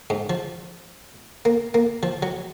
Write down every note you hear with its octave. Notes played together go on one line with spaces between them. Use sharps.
G#2
F3
A#3
A#3
F3
F#3